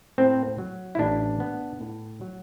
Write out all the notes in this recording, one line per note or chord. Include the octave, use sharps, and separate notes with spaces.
A2 C4
F#3
E4
A1 D4
B3
A2
F#3